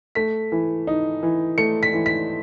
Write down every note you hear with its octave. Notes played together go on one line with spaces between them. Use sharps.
A3 B6
E3
D#4
E3
A3 C#7
B6
E3
B6